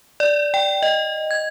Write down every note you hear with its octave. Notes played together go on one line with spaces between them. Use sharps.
D5
G5
D#5
G#6